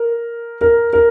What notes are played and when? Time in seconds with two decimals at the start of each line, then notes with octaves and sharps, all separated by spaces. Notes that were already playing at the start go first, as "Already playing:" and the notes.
Already playing: A#4
0.61 A#4
0.93 A#4